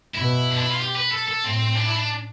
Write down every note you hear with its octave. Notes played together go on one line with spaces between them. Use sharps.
B2 E4
D4
E4
F4
G4
B4
A4
A4
A2 C4
D4
E4
D4